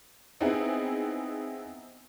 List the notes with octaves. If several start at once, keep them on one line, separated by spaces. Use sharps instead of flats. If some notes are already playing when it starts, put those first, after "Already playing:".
B3 C4 D#4 E4 G#4